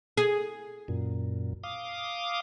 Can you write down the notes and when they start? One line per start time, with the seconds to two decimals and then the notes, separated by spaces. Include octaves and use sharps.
0.17 G#4
0.88 F#2 A#2
1.63 F5 D6 D#6